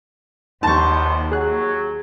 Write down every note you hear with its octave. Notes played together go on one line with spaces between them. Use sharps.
A#1 D#2 B3 D#4 C5 A5 A#5 C#6
F#3 G#4 F#6